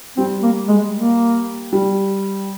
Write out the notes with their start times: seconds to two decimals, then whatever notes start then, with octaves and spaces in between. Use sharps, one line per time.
0.17 G3 C4
0.43 A#3
0.68 G#3
0.95 A#3
1.73 G3